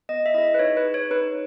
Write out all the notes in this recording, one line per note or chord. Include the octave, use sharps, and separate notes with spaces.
B3 D#5
E5
E4 G#4 D#5
B4
D#4 C#5
B4
G#4
C#5
D#4 B4